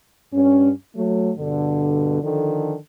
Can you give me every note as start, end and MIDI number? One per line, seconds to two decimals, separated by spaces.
0.33 0.71 43
0.33 0.71 61
0.96 1.30 54
0.96 1.30 57
1.38 2.20 43
1.38 2.20 47
1.38 2.20 50
2.23 2.76 50
2.23 2.76 51
2.23 2.76 53
2.23 2.76 69